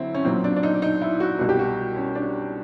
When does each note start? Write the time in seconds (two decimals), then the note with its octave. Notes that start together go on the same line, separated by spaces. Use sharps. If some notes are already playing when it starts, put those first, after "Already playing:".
Already playing: D3 F#3 C4 E4
0.14 C#4
0.25 B1 A#2 F#3 C4
0.44 D4
0.56 D4
0.63 D#4
0.82 D#4
1.02 E4
1.20 F#4
1.39 C2 B2 G3 F#4
1.49 G4
1.59 F#4
1.96 C#4
2.15 D4